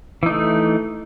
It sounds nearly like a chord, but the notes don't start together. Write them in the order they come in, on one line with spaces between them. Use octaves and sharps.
E3 D#4 A3